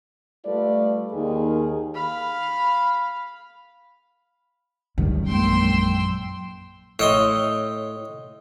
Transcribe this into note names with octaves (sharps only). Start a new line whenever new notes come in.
G3 A3 F4 A4 B4 D5
D#2 D#3 G#4
F5 B5
C#2 F#2 D#3 G3
A#1 G#3 A#3 G5 C6 E6
A2 C#5 D#5 C6